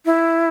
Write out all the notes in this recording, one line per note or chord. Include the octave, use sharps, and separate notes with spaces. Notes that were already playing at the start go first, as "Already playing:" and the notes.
E4